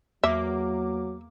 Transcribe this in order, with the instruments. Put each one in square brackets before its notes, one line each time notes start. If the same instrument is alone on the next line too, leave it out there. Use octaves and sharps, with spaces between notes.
[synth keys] E2 A#3 D6 [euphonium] F#3 [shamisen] E5